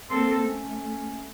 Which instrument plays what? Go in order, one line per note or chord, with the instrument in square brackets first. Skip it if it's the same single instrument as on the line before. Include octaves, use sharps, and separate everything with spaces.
[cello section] A#3 C4 A4 [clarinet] C6
[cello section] A3 [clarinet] C#4